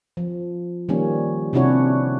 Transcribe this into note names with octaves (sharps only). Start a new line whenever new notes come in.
F3
D#3 F3 G3 A#3 C#4
C3 C#4 D4 E4 F#4 C#5